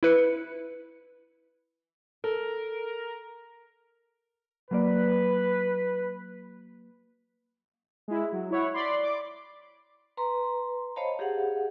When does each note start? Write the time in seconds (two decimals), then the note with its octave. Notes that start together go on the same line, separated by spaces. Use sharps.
0.03 E4 B4 C#7
2.24 A4 A#4
4.71 F#3 A#3 B4 D5
8.08 G#3 E4
8.32 F#3
8.51 E4 C#5 F#5
8.74 D5 B5 C6
9.03 D6
10.17 B4 A#5 C6
10.96 C5 C#5 D#5 F5 A5 B5
11.19 G4 G#4 F5 F#5